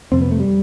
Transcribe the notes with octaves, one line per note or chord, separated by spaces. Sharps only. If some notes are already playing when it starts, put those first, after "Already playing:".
F2 C3 C4
B3
A3
G3